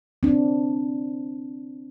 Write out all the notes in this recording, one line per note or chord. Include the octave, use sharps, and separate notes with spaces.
C4 D4